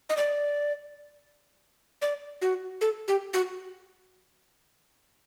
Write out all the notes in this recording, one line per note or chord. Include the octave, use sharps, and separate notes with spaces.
D#5
D5
D5
F#4
A4
G4
F#4